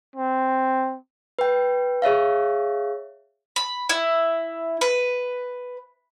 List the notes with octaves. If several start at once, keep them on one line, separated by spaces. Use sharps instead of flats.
C4
B4 G5
G#4 C#5 E5 F5
B5
E4
B4